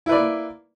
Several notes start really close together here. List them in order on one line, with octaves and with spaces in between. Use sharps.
E4 B4 D5 A#3